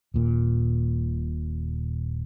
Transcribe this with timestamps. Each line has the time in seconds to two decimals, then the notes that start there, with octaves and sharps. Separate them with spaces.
0.14 D#1 A#2